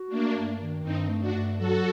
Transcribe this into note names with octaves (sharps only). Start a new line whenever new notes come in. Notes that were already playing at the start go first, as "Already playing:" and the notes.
Already playing: F#4
A3 A#3 D4
G2
D#3
G2 C4 D#4
A3
D4 F#4
G2
F#3 F#4 A4